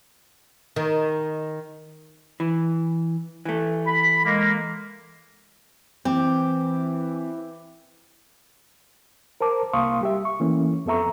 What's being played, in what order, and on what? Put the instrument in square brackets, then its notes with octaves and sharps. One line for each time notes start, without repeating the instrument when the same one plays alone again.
[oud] D#3
[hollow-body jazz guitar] E3
E3 A3
[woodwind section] B5
G#3 A#3
[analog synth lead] E3 [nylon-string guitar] C4 [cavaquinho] G4
[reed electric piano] A#4 C5 A5 D6
C2 A#3 F5 C6 C#6 D#6
G3 G4 E5
C#6
E3 A3 A#3 C#4 E4
F2 B3 A4 E5 A#5 C#6